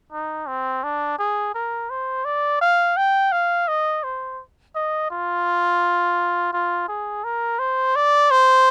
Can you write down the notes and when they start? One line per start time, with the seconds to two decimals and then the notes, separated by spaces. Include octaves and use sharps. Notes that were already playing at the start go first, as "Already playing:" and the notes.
0.12 D#4
0.48 C4
0.84 D4
1.19 G#4
1.55 A#4
1.90 C5
2.25 D5
2.61 F5
2.97 G5
3.32 F5
3.68 D#5
4.04 C5
4.75 D#5
5.11 F4
6.53 F4
6.88 G#4
7.24 A#4
7.59 C5
7.96 D5
8.31 C5